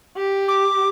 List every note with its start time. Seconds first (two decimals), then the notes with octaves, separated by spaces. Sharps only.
0.17 G4
0.48 D6